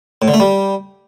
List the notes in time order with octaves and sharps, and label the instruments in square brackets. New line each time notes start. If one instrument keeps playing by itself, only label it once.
[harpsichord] A2
D3
A3
G3